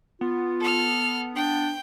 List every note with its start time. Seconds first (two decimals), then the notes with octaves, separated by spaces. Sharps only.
0.21 B3 F4
0.60 A4 F6
1.35 D4 G5